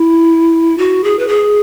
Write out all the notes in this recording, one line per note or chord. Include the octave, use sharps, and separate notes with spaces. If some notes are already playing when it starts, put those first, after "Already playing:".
Already playing: E4
F#4
G#4
B4
G#4